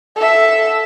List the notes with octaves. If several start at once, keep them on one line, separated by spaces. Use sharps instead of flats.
A4 E5